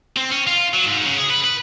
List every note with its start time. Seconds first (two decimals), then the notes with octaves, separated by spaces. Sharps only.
0.17 C4
0.31 C#4
0.47 F4
0.74 F#3
0.86 G#2
1.06 C#3
1.18 G#4
1.31 B4
1.45 B4